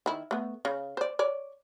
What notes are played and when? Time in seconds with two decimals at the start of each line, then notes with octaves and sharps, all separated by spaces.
0.06 D#3 E4
0.31 A3 B3
0.65 C#3
0.97 C5 D5
1.19 C#5 D5